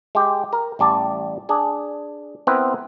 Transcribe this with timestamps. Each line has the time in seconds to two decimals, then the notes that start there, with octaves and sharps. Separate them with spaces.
0.15 G#3 G4
0.53 A#4
0.79 A1 G3 D5 A5
1.49 D4 G#4
2.47 B3 C4 E4 A#4 B4